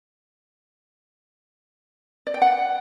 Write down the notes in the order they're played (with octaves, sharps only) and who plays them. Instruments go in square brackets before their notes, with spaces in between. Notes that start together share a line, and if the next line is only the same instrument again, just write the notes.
[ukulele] D5
G5
F#5